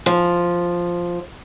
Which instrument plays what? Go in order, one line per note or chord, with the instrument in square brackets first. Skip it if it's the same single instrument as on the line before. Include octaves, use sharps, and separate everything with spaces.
[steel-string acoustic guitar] F3